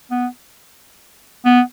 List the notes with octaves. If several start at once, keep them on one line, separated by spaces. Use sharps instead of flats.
B3
B3